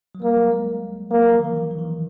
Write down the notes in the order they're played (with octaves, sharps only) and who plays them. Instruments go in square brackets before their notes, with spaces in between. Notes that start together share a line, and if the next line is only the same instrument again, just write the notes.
[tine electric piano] F#3
[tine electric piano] G3 [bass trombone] A#3
[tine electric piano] F#3
G#3
[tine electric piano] F#3 [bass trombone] A#3
[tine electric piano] F#3
F3
D#3
E3
D#3
E3
D#3